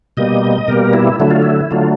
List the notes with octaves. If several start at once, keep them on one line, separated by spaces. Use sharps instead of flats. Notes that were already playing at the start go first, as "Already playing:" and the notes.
B2 G3 A#3 D#5
B2 G3 A#3 A#4
E4
D3 F#3 A3 E4
F4
E4
D3 F#3 A3 F4